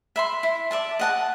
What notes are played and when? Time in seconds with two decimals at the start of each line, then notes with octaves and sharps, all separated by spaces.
0.16 E5 B5 C6
0.43 E4
0.71 D5 E5 A5
0.99 D#5 F#5 A5